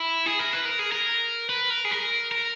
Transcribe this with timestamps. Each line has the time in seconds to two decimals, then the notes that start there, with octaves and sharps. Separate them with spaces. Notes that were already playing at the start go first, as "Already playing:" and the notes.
Already playing: E4
0.26 G#4
0.39 A#4
0.53 B4
0.65 A#4
0.79 G#4
0.92 A#4
1.49 B4
1.70 A#4
1.85 G#4
1.91 A#4
2.31 A#4